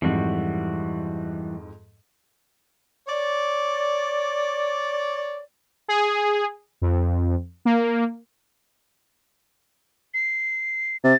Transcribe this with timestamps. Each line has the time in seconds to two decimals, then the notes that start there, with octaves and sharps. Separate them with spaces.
0.02 F2 G#2 E3 G3 F#4
3.08 C#5 D5
5.88 G#4
6.82 F2
7.65 A#3
10.14 C7
11.04 C3 A6